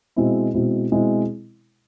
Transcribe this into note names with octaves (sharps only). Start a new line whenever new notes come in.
B2 G#3 C4 E4
B2 G#3 C4 E4
B2 G#3 C4 E4